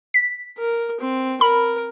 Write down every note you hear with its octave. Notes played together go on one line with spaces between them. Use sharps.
B6
A#4
C4
A#4 B5